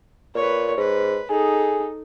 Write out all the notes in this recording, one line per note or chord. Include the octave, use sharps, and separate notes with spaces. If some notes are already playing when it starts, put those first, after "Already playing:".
A#2 B4 C#5
G#2 B4
D#4 G#4 A4